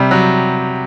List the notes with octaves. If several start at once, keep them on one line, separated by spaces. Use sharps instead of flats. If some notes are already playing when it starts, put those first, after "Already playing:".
Already playing: C3 G3
F#3